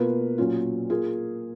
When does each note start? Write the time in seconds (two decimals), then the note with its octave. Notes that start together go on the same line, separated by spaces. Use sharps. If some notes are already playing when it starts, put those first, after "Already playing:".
Already playing: B2 A#3 F4 B4
0.38 A#2 F#3 C#4 F4
0.90 A#3 F4 G#4